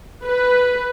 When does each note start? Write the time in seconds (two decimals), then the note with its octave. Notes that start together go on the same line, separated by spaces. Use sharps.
0.24 B4